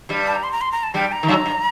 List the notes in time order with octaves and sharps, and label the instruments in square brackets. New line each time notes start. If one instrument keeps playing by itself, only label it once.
[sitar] G2 G3
[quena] A5
A#5
C6
A#5
C6
A#5
A5
[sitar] G2 G3 [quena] G5
[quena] A#5
[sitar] D#3
F#2 F#3
G2